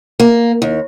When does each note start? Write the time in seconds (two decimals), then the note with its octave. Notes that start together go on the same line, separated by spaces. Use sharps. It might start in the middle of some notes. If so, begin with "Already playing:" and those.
0.20 A#3
0.62 D#2